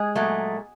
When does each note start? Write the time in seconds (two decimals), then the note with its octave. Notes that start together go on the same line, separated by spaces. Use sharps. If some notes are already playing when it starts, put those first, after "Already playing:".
Already playing: G#3 G#4
0.15 A#2 F#3 A3